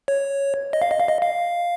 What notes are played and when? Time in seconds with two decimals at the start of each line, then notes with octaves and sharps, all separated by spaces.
0.08 C#5
0.73 D#5
0.82 F5
0.91 D#5
1.00 F5
1.08 D#5
1.22 F5